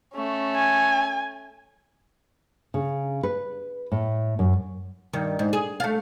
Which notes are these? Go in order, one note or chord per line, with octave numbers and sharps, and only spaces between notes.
A3 C#4
G#5
C#3
B4
A2
F#2
G2 D#3
G#2
G#4
A3 F5